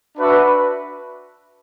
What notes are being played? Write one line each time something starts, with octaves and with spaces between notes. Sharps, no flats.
D4 F#4 B4 E5